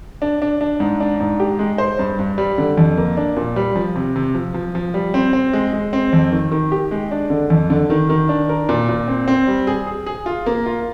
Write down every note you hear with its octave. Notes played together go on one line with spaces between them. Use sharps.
D4
D4
D4
G#2
D4
G#2
G4
G#3
C5
G2
G2
G3
D3
F2
A#3
D4
A#2
G3
F3
C3
C3
F3
F3
F3
G3
C4
C4
G#3
G#3
C4
F2
D#3
D#3
G4
G#3
D4
D3
F2
D3
D#3
D#3
D4
A#4
A#2
A#2
C4
C4
G3
G#4
G#4
G#4
F4
A#3
F4